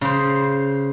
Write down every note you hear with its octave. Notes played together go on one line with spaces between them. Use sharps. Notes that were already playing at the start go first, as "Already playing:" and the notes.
C#3 C5